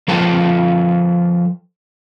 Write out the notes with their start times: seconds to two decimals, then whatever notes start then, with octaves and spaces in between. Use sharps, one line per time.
0.08 F3 F4 A4 B4 G5 A5